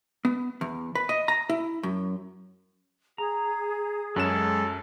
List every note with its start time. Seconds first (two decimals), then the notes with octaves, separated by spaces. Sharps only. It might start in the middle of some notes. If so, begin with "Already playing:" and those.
0.25 B3
0.61 E2
0.95 B4
1.09 D#5
1.28 A#5
1.49 E4
1.83 F#2
3.18 G#4 A#5
4.16 F#2 F#3 G#3 C#4 A4 E7